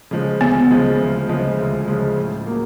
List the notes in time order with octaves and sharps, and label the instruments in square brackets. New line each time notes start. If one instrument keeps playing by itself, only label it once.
[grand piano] C#3 F3 G#3
[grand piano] D2 [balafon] B3
[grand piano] C#3 F3 G#3
D2
C#3 F3 G#3
D2
C#3 F3 G#3
A2
F#3 A#3